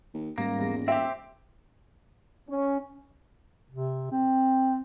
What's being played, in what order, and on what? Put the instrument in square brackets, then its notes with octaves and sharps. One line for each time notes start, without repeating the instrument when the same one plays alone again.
[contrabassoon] D#2
[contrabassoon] D#1 [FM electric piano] G#2 G3 A#6 [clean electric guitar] A#3
[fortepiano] E2
[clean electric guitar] C4 G4 [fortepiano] E5
[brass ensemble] C#4
[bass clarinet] C3
C4